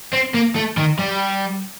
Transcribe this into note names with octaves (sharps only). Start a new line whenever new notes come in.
C4
A#3
A3
D#3
G3